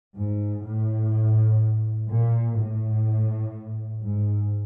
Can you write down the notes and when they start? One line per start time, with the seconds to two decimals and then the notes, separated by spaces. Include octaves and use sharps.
0.16 G#2
0.65 A2
2.10 A#2
2.58 A2
4.03 G#2